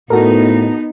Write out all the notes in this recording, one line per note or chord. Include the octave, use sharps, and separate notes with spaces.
A2 B3 D#4 F#4 A4 A#4